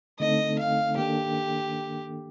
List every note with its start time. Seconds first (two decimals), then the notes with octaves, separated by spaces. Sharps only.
0.20 D3 A3 C4 D#4 A4 D#5
0.59 F5
0.97 D#3 A#3 D4 G4 A4